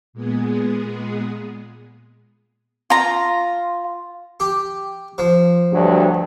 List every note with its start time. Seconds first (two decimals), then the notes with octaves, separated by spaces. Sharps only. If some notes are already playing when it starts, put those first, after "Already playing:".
0.13 A#2 G#3 B3 G#4
2.90 F4 A#5
4.40 G4
5.18 F3
5.72 D2 G2 F#3